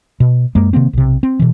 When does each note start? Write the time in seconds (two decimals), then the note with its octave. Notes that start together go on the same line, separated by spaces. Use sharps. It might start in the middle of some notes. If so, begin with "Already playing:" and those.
0.20 B2
0.55 F#2 G#3 A#3
0.73 C3 D#3 A#3 C4
0.93 B1 C3
1.23 C4
1.39 B2 E3